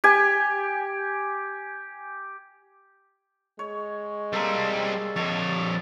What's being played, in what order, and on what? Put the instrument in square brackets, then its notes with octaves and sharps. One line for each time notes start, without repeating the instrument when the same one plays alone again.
[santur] G4 G#5
[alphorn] G#3 [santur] C#5
[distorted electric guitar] G3 C4 [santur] A#3 A4
[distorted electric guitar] F2 C#5 [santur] A4 D#5 A5
[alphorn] G3